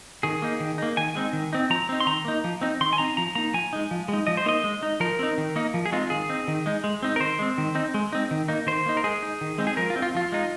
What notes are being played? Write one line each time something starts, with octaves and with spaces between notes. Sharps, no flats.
D#3 G#4
A#3 D#4
D#3
A#3 D#4
D#3 G#5
G#3 C4 D#4
D#3
C4 D#4
F3 A#5
C4 D#4
C6
D#3 A#5
A#3 D#4
F3
C4 D#4
D#3 C6
G#5
C4 D#4 A#5
F3 A#5
A#3 D#4 A#5
F3 G#5
G#3 D#4
F3
G#3 D#4
F3 D#5
C5
A#3 D#4 D#5
G#3
D#4
F3 A#4
C4 D#4
D#3
A#3 D#4
F3
G#4
G#3 C4 D#4 F4
D#3 G#4
C4 D#4
D#3
G#3 D#4
G#3
C4 D#4
A#4
D#3 C5
G#3 C4
D#3
C4 D#4
G#3
C4 D#4
D#3
A#3 D#4
D#3 C5
A#3 D#4
A#4
G#3 G#4
D#4
D#3
G#3 C4 D#4
G#4
F3 A#4
F4
C4 D#4
F4
F3 F4
G#3 D#4